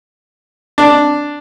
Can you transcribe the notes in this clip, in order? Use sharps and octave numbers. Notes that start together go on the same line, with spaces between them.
D4